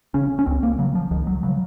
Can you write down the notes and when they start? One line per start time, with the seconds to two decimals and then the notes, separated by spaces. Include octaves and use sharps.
0.14 C#3 C#4
0.39 C#4
0.46 C#2 C4
0.63 A#3
0.79 C#3 F#3
0.95 F3
1.11 C#2 D#3
1.27 F#3
1.43 C#3 F#3